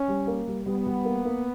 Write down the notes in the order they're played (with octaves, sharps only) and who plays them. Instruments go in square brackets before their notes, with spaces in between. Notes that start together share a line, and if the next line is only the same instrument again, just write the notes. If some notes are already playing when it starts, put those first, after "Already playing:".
Already playing: [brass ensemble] C#4
[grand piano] G3
A#3
G3
[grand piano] G3 [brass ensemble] B3
[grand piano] G3
A#3
A#3